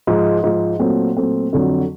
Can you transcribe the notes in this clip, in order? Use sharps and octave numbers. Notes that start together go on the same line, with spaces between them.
G#2 F3 G#3
G#2 F3 G#3
A#2 F#3 A3 C4
A#2 F#3 A3 C4
F2 D3 F#3